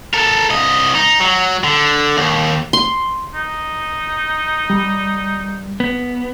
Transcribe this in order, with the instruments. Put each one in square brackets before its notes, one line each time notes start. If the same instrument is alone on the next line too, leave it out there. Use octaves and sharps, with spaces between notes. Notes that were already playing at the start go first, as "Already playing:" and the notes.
[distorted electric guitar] A4 A#4
C2 D#5
D#4
F#3
D3
D#2
[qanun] C6
[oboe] D#4
[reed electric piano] G3
[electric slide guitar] B3